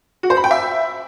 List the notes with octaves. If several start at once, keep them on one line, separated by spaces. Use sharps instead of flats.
F#4
C5
B5
G5
E5